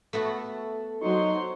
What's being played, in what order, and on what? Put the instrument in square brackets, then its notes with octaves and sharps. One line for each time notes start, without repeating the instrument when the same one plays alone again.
[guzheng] A3 B3 F#4 [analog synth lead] A4
[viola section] F#3 C5 C6 [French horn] D#4 [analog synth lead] C#6